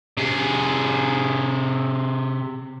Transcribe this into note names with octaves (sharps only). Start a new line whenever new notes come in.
C3 G#4